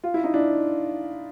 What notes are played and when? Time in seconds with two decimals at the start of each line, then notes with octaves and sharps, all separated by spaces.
0.04 F4
0.14 E4
0.24 D#4
0.34 D4 E4